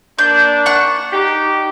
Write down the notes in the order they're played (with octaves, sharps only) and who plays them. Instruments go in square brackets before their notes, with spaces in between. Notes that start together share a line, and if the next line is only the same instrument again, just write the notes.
[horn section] A#3 D4 [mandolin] G6
[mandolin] F#5 C#6
[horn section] D#4 G4